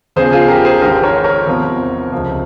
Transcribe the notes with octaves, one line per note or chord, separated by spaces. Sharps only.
E2 C#3 F3 G#4 C5
F4 G#4
G4 A#4
G#4 C5
G#1 G#2 F3 G4 A#4
A#4 C#5
A#4 C#5
E2 C3 F3
C#2 C3 F3